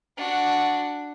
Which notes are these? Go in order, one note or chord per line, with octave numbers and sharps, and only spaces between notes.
D4 F#4